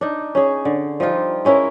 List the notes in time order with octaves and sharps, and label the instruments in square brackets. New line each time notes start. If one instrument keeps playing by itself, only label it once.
[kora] D4 D#4
C#4 G#4
D3
F3 G3 D#4 F4
G#3 C#4 E4 A#4